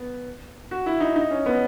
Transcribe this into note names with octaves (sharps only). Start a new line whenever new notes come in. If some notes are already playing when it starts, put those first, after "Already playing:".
Already playing: B3
F#4
E4
D#4
D#4
C#4
B3